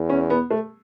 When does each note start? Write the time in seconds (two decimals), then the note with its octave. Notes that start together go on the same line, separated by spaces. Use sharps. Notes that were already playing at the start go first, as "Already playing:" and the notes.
Already playing: E2
0.10 C#4
0.30 B3
0.51 A3